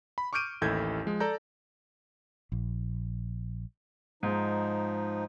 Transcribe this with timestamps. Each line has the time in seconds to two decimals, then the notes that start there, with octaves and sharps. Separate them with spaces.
0.18 B5
0.33 C#6 D6 F6 G6 D7 D#7
0.62 A1 D#2 E4 A4 G6 G#6
1.06 F3 G#3
1.20 A4 D5 A#5 G6
2.52 A#1
4.23 G#2 F3 D#4